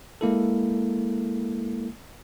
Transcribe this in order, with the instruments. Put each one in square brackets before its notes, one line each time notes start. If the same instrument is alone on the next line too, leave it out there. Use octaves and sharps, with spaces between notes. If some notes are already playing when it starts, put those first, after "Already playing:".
[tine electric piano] G#3 A#3 E4 A4